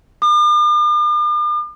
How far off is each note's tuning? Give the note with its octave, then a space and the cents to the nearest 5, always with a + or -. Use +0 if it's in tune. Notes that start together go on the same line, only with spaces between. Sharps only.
D6 +45